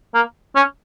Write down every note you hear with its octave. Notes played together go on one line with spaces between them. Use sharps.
A#3
C#4